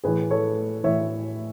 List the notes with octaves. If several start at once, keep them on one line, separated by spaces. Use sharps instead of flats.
A2 E3 G#4 B4
A4 C#5
A2 E3 C#5 E5